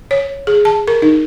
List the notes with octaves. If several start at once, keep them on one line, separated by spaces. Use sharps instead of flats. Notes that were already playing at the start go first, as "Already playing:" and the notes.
C#5
G#4
A5
A#4
D#4